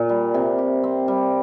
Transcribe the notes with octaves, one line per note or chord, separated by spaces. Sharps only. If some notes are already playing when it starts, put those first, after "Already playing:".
Already playing: A#2
G3
C3
G4
C4
G3